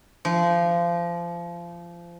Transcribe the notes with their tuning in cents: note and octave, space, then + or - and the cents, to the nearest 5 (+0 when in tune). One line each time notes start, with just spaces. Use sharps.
F3 -25